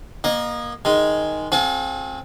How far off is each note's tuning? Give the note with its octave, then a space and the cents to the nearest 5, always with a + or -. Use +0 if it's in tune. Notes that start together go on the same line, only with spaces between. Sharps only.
A#3 +20 D#5 -20
D#3 +0 G#3 +0
C4 +20 F4 +45 G#4 +45